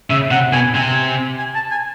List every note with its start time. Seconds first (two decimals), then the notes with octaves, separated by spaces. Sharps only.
0.10 C#3 E5
0.31 C3 F#5
0.53 B2 G#5
0.74 C3 G#5
1.39 G#5
1.55 A5
1.71 G#5